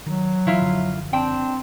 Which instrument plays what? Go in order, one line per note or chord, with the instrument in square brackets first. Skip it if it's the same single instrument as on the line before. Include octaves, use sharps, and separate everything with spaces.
[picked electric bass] D#3 [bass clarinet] F#3
[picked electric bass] D#3 E3 [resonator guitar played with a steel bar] E4 F4 E5
[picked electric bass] F#1 D3 F3
[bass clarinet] C4 [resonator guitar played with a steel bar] D4 G5